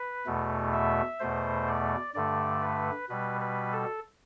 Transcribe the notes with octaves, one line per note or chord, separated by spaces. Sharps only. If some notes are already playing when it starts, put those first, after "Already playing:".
Already playing: B4
E2 B2 A3
E5
E2 B2 A3 C5
D5
G2 D3 A3 D5
B4
B2 G3 B4
B4
A4